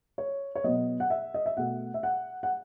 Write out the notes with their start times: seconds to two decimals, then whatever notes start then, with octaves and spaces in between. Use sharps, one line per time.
0.18 C#5
0.55 C#5
0.64 B2 F#3 B3 D#5
1.00 F#5
1.10 E5
1.34 D#5
1.46 E5
1.57 B2 A3 F#5
1.94 E5
2.03 F#5
2.43 F#5